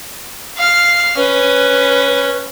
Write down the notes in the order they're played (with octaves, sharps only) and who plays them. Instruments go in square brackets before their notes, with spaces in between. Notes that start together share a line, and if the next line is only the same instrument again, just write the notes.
[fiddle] F5 F6
[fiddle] C#4 [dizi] B4